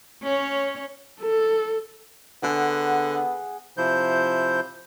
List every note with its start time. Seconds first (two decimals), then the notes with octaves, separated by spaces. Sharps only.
0.22 C#4 C#5
1.21 A4
2.43 D3 B3 G#4 F#5
3.77 C3 F3 E4 C5 G6